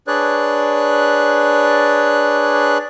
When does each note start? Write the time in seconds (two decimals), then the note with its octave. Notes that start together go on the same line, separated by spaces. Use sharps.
0.07 D4 G#4 B4 C#5 D5 F#6